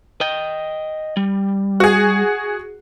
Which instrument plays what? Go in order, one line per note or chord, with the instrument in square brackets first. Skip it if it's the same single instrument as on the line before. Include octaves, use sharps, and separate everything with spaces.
[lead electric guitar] D#5 G5
G3
[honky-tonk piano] F#4 G#4